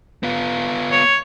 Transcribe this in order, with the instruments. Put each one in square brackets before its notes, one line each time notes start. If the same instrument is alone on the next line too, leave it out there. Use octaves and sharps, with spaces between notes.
[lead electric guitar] B3 F4
[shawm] C#5